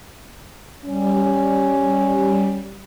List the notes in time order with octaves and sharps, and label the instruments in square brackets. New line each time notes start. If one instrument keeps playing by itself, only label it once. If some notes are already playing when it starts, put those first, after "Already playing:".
[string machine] G3 [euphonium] C#4